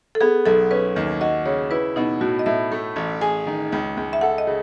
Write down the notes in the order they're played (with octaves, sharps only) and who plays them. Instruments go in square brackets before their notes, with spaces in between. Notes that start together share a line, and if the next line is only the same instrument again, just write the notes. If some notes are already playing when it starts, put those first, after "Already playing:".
[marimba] A4
[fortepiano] B3 [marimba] G#4
[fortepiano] B1 [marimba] A4
[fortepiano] C#4 [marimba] B4
[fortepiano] D#2
[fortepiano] F#4 [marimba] D#5
[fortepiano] C#3 [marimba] C#5
[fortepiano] E4 [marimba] B4
[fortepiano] B2 [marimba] D#4
[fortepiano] A2 [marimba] F#4
[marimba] D#5
[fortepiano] A2 [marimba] E5
[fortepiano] A3
A1
[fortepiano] G#4 [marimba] G#5
[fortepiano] D#3
C#2
C#2
[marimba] E5
[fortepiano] A4 [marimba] F#5
[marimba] D#5
[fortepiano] C#3